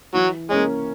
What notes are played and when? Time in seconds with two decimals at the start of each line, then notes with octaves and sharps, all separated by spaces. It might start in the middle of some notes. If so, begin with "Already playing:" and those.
0.14 E3 F#3
0.51 G#3 A#3 C#4